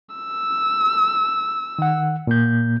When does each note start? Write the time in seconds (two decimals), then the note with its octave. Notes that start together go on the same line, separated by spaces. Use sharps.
0.15 E6
1.79 D#3 F#5
2.27 A#2 A#3 G6